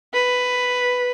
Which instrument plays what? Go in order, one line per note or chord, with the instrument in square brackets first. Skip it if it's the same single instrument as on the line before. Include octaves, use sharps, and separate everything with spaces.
[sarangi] B4